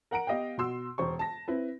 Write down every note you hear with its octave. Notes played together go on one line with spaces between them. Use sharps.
A#4 F#5 A#5 D7
B3 G4 D#5 F5 G5
B2 F#4 C6 E6
E1 C5 C#6
A5 A#6
C4 E4 B4